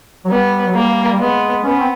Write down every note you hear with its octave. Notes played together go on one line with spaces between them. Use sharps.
F#3
G3 B3
F#3
G3 A#3
G3
G#3 B3
B3 C#4
C4